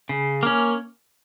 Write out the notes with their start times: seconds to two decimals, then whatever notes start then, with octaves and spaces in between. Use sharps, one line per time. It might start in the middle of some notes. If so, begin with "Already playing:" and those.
0.09 C#3
0.43 A#3 C#4